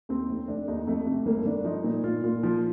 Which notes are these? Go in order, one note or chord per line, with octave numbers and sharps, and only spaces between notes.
D#2 C4
F1
F1 D4
D#2 D#4
F2 A3
C3
G1 A#3
G1 D4
F3 D#4
A#2
A#2 F4
A#2 F4
F3 F4